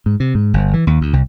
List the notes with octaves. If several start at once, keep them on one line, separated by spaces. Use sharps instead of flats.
G#2
C3
G#2
G1
E3
D#2
D2
C2